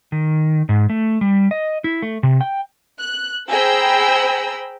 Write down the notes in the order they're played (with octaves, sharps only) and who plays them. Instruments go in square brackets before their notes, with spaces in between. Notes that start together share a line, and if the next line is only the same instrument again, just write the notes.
[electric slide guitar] D#3
G#2
A3
G3
D#5
E4
A3
C3
G5
[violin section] F#6
G#4 C5 G5 A#5 B5 E6